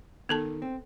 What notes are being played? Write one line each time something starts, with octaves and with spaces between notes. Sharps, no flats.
D#3 B3 A4 A5
C4